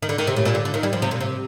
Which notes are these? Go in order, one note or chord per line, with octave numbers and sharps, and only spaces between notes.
D#3
D3
D#3
C3
A2
A#2
D3
D3
D#3
G3
F3
C3
A#2
C3